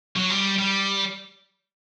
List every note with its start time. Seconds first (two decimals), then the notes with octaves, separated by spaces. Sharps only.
0.16 F#3
0.30 G3
0.58 G3